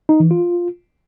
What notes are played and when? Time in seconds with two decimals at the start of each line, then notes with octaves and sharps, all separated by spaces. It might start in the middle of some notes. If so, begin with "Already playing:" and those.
0.09 D#4
0.20 E3
0.31 F4